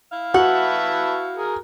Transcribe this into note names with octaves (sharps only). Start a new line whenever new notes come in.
E4 F5
F#4 B4 E5 F#5 A5
G#4 A#4